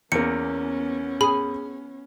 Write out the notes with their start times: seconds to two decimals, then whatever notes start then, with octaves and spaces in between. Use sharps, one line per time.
0.12 E2 A#3 B3 C#4 C#7
1.21 G#4 B5